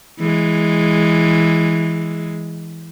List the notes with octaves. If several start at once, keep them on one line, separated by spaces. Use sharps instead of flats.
E3 G#3